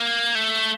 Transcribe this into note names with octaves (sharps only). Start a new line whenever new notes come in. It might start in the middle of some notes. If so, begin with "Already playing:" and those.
Already playing: A#3
A3